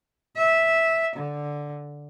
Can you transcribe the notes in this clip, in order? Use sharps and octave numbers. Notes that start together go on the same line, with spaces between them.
E5
D3